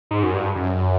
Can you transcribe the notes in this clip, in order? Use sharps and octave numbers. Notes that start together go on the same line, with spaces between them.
G#2
F#2
G2
F#2